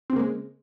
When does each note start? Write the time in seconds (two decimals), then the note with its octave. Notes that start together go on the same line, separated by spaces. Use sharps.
0.10 C4
0.13 C#3
0.16 A#3
0.19 G#3